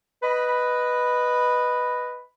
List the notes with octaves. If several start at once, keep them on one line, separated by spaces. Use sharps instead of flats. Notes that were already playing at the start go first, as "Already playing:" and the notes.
B4 D#5 B5